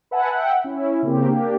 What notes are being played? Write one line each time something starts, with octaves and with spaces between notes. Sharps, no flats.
B4 E5 F#5 G#5 A5 B5
E5 F#5 G5
C#4 E4
C#3 A#3 C4 G4
A#3 D4 G4